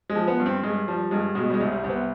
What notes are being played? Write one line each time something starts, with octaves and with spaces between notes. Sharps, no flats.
G#3
F3
B3
G2
C4
G2 G#3
F3 G3
G2 G#3
B2 G#3
G3
G#3
C2
G3
C2
B3